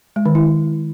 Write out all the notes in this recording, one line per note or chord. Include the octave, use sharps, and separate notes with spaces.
G#3
D#3
E4